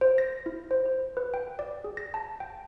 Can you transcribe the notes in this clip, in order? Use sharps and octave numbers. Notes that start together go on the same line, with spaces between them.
C5
A#6
E4
C5
C5
B4
G5
D5
G#4
A#6
A5
G5